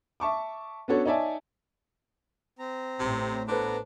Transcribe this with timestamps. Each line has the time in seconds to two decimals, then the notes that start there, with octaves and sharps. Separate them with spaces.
0.20 E5 A5 C#6 D6
0.88 B3 C#4 D4 F#4 A4 C#5
1.06 D#4 C#5 D5 E5 G#5 A5
2.59 C4 A#5
3.00 A1 A2 C3
3.48 B3 D4 A4 B4 C5 A#5